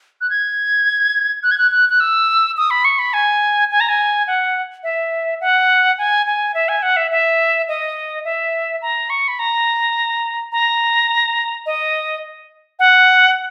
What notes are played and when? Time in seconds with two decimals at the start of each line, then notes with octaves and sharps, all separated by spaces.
0.21 F#6
0.30 G#6
1.43 F#6
1.51 G#6
1.58 F#6
1.71 F#6
1.89 F#6
2.00 E6
2.57 D#6
2.71 B5
2.85 C#6
2.99 B5
3.14 G#5
3.71 G#5
3.80 A#5
3.89 G#5
4.27 F#5
4.83 E5
5.41 F#5
5.98 G#5
6.27 G#5
6.54 E5
6.69 G#5
6.82 F#5
6.97 E5
7.11 E5
7.68 D#5
8.25 E5
8.82 A#5
9.10 C#6
9.28 B5
9.39 A#5
10.52 A#5
11.66 D#5
12.79 F#5